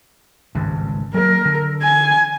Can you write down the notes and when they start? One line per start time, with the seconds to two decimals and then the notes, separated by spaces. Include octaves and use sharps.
0.55 G#1 C#2 G2
1.14 F#3 G3 A#3 A#4
1.45 D3
1.82 G#5